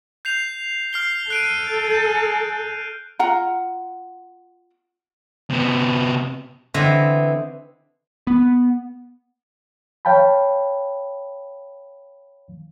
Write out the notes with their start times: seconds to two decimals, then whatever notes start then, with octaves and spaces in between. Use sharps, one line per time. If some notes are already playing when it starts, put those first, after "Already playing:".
0.25 G6 C7 F7
0.93 F6 C7 G7
1.30 A4 F#6 D7 D#7
1.91 G6
3.19 F4 F#5 A#5
5.50 C3 B3
6.74 D3 E3 C4 D#5
8.27 B3
10.05 C#5 F5 G5 A5 B5